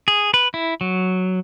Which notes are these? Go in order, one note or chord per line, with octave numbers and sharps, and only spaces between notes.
G#4
B4
E4
F#3